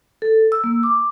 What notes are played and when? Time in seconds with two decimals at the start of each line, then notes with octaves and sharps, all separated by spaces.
0.22 A4
0.52 E6
0.64 A#3
0.83 D6